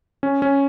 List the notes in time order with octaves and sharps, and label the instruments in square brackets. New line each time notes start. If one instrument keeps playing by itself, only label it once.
[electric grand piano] C#4
C#4